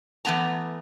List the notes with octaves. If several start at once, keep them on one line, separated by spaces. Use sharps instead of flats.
E3 A3 B3 A5 A#5